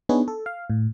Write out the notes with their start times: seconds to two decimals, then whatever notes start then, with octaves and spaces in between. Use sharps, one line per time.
0.09 B3 D4 D#4 G#4 B4 C#5
0.28 A4
0.46 F5
0.70 A2